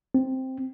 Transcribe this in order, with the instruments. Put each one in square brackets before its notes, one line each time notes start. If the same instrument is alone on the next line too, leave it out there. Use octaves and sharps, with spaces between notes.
[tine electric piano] C4